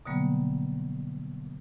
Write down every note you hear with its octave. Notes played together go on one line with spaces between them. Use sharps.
B2 D3 F#3 G3 A#3 B3